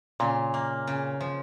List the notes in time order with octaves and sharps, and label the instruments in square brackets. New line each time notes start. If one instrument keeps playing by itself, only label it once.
[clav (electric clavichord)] A#2 [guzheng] C#3
[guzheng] A#3
C#3
F3